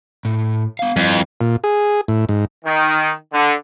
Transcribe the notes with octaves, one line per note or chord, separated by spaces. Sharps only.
A2
B3 F5
F2 G3 E4 D#5
A#2
G#4
A2
G#2
D#3
D3